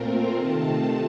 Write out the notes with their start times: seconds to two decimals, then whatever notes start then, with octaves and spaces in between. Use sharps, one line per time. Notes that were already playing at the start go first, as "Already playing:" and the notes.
Already playing: A#2 A3 C4 F4 A#4
0.35 C3 D#3 A3 C4 F4 A5